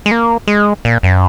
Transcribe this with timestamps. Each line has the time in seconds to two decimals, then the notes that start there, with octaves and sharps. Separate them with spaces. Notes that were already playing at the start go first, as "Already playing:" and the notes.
0.06 G#3
0.11 A#3
0.47 G#3
0.85 A#2
1.03 F#2